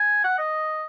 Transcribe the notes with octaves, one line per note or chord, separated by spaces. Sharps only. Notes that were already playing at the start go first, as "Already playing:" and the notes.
Already playing: G#5
F#5
D#5